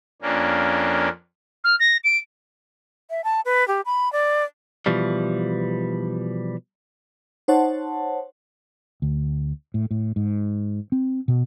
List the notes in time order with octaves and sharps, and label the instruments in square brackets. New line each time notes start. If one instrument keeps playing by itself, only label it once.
[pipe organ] F2 A#3 C#4 D4
[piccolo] F6
A#6
D7
[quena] E5
A5
B4
G4
B5
D5
[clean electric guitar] B2 E3 F3 G3
[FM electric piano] D#4 C5 C#5 F#5 A5
[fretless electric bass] D2
A2
A2
G#2
C4
B2